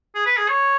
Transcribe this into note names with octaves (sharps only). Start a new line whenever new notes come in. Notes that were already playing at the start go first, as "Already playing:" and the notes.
G#4
B4
G#4
C#5